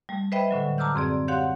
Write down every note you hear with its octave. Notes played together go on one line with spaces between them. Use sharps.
G3 A3
B4 C5 D#5 E5 G5 B5
A2 D3 F#3
A5 A#5 D6 E6 F6 G6
F#2 C4 G#4 D5
G4 C#5 F5 F#5 C6 F#6